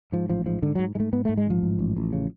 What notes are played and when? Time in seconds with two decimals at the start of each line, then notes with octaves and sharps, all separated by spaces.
0.12 G#2 F3
0.29 A1 F3
0.46 G#2 F3
0.62 G#2 D3
0.75 G#2 F#3
0.95 G#2 G#3 A3
1.13 G#2 B3
1.25 G#2 A3
1.37 G#3
1.46 A1 F3
1.63 G#2
1.79 A1
1.97 A1
2.13 C#3